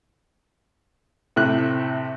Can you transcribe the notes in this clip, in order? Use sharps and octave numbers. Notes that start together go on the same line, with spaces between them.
A2 C3 F#6